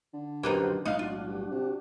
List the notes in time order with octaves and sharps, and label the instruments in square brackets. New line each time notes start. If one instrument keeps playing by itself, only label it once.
[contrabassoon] D3
[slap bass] D#1 F#2 [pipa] A#3 B3 D#4 [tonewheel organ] F#4 G4 C5
[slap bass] B1 A2 G#3 [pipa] D#4 F5 [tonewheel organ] F#6
[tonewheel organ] D4 F#4 [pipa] F4
[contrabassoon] G2
C3